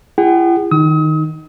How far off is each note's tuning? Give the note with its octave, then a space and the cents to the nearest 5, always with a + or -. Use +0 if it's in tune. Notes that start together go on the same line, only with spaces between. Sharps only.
E4 +45 G#4 -40 F#5 +35
D#3 +0 D#4 +0 D#6 +40